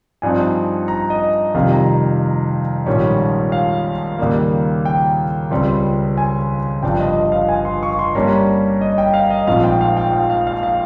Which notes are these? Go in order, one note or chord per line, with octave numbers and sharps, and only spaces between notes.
G2 F3 C4 D#4 G#5
A#5
D#5
F2 C3 D#3 G3 F5
A#5
A#1 G#2 D#3 G3 C#4
F5
D#2 C#3 G3 A#3
G5
C#2 C#3 G3 C4
G#5
G1 G2 F3 G5
D#5
D#5
F5
G#5
C6
C#6
C6
G2 G3 A#3 C#4 A#5
D#5
G5
F5
D#5
A#1 G#2 F3 C4 F5
G5
F5
G5
F5
F5
F5
F5